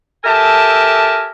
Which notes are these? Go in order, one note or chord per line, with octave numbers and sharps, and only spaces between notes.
G4 A4 A#4 E5 G#5 A5